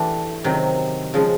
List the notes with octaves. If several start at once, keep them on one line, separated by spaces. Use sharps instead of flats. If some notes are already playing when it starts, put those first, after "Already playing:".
Already playing: E3 A3 D4 G4
C3 D#3 F#3
C#3 F3 G#3